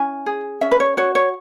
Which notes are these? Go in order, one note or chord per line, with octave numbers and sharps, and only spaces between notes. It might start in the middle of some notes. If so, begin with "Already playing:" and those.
Already playing: C#4 E4 G#5
G#4
C#4 E5
B4
C#5
F#4 C#5
C#5